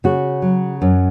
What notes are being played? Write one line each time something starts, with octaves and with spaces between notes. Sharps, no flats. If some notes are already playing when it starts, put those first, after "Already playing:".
C#3 F#4
F#3
F#2